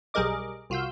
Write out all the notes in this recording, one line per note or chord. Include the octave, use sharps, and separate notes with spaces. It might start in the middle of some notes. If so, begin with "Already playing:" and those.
B1 G3 G#4 A#4 D#5 D6
C2 F4 F#4 F5 E6 G6